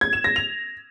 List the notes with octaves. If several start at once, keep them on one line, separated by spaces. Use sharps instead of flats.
G#6
E7
A#6
F7